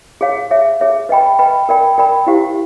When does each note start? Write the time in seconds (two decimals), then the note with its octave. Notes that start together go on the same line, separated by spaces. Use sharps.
0.21 G#4 C#5 F5
0.51 G#4 C#5 E5
0.81 G#4 C#5 E5
1.09 B4 D#5 G5 B5
1.39 B4 D#5 G5 B5
1.69 A#4 D5 G5 B5
1.98 A#4 D5 G5 B5
2.27 E4 G4 C5 F5